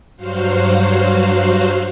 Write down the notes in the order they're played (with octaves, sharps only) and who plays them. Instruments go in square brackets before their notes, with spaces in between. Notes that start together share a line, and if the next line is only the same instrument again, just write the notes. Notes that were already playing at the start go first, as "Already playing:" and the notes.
[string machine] G2 F#3 F#4 C5 F5